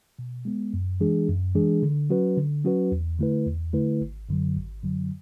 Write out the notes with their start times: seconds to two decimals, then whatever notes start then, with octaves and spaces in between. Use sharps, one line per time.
0.19 B2
0.45 G#3 B3
0.73 F#2
1.00 E3 G#3 D4 G#4
1.28 F#2
1.55 E3 G#3 D4 G#4
1.83 D3
2.10 F#3 C#4 F#4 B4
2.37 D3
2.64 F#3 C#4 F#4 B4
2.92 E2
3.19 D3 A3 E4 B4
3.46 E2
3.73 D3 A3 E4 B4
4.01 G#1
4.29 F#2 D3 F#3
4.56 G#1
4.83 F#2 D3 F#3